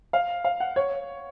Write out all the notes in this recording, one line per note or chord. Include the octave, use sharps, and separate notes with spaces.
F5
F5
F#5
C#5